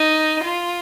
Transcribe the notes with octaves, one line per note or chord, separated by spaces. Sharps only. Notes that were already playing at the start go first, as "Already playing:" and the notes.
Already playing: D#4
F4